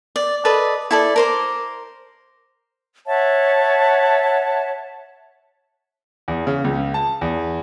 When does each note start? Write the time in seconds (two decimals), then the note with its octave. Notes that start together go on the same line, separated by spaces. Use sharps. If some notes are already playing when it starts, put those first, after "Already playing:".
0.16 D5
0.45 A4 B4 D5 D#5
0.91 E4 A4 D5
1.16 A#4 C5 D6
3.07 C#5 E5 F#5 A5
6.28 E2
6.47 C#3
6.64 C#2
6.94 A5
7.21 E2